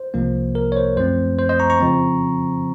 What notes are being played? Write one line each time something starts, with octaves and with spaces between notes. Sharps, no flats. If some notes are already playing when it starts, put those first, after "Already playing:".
Already playing: C5
C2 C3 F3 A#3
A#4
C#5
C5
F#2 F3 A3 C4 C5
C5
C5 D#5
A#5 C#6
A#5 C#6
F2 C#3 F3 C4